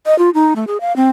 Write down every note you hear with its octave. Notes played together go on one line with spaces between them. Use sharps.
D#5
F4
D#4
A3
G#4
F5
C4